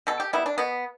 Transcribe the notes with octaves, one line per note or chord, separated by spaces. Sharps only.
B2 A4
G4
G3 B3 E4
D4
B2 B3